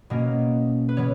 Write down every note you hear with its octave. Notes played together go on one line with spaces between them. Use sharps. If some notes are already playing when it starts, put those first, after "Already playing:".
B2 A#3 C#4
B4
C#3 E3 B3 C#5